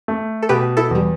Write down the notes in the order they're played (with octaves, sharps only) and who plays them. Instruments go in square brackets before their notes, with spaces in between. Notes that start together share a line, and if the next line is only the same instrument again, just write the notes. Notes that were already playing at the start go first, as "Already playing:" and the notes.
[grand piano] A3
[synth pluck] A4
[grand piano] B2 [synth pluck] G4 B4
[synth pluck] E4 A4
[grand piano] E2 [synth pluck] G3